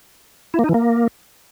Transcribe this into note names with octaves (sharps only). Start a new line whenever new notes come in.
E4
A#3
D#4
E3
A#3